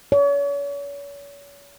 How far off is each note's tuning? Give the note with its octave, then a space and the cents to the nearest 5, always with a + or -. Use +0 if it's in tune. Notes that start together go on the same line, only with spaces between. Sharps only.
C#5 +40